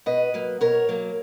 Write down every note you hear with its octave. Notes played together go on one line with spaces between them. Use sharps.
B2 B4 D#5
F#3 A#3
B2 A#4 C#5
F#3 A#3